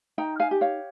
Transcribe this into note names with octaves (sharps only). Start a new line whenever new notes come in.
D#4 G5 A#5
F5 G#5
G4
C#5 F5